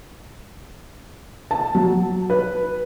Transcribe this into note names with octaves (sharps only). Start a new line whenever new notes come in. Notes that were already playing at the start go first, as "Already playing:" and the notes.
A5
F#3
B4